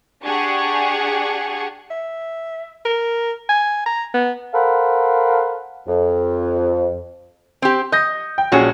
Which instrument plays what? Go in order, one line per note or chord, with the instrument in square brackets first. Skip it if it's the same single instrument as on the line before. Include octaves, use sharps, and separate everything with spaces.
[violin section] D4 G4 G#4 F#5 C#6
[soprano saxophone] E5
A#4
G#5
A#5
B3
[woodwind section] A4 A#4 C5 F5 F#5 B5
F2
[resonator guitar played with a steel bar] C4 G4
[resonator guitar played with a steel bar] D#5 [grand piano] G6 A#6
[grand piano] G5
[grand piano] A#1 C#4 G#4 [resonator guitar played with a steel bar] G3 F#4